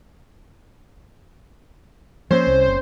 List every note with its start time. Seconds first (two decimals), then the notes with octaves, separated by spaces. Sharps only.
2.31 F3 A#3 C4 C#4 C5
2.47 C2
2.68 F#1